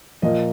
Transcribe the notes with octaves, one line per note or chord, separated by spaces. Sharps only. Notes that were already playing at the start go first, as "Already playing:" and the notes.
A#2 F3 A#3 D#5